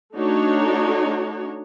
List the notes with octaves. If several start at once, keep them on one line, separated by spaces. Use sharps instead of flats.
A3 D4 D#4 F#4 C#5